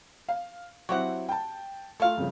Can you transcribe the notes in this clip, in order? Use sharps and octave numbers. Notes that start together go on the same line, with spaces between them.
F5
F#3 C4 E4 F#4 G4 F#5
G5 A5
A3 F4 A4 A#4 F5
G1 C#3 F3